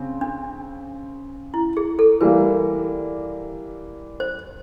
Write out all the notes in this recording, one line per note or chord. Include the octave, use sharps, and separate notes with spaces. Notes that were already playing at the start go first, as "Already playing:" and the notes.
Already playing: C#3 C4
D4
E4
G#4
A4
E3 G3 A#3 B4
C5